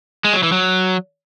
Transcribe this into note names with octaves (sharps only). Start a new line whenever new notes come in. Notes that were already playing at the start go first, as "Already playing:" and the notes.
G#3
F#3
E3
F#3